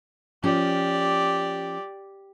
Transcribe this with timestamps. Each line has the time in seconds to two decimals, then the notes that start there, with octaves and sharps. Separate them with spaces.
0.43 F3 C#4 G4 D5